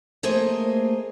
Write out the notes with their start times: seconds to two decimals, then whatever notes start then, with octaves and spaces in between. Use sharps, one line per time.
0.23 A3 A#3 G#4 C5 D#5